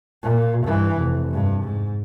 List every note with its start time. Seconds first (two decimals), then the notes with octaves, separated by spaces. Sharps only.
0.23 A#2
0.64 G2 E3
0.97 F1
1.33 G2
1.63 G#2